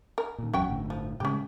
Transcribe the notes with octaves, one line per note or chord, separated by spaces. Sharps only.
A#4
A#2 D#3
G1 E2 F#3 C#4 F#4 G5
G1 A2 D3
F3
A2 C#3 G#3 C#4 G4